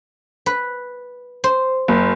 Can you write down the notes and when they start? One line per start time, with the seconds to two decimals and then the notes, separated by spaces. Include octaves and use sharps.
0.46 B4
1.44 C5
1.88 F#1